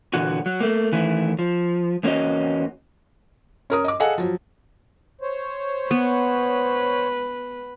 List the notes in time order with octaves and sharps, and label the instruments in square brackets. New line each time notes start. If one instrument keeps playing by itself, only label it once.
[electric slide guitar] E2 A#2 D3 E3 F#4
F#3
A3 A#3
D#3 E3 A3 E4
F3
E2 A#3 C#4 F#4 D#5
[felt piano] C#4 A#4 D#6
D#5 D6
G#4 A4 D#5 F5 F#5 G#5
F3 F#3
[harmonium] C5 C#5
[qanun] B3 [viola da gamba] B4